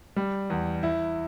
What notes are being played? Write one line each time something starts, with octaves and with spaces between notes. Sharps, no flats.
G3
E2
E4